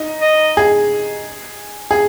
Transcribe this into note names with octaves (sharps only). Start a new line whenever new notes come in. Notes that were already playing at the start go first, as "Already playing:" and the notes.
Already playing: D#4
D#5
G#4
G#4